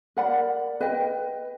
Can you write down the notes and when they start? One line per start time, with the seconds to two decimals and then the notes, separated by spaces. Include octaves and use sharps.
0.17 A#4 D5 F#5 B5
0.81 B4 D#5 G5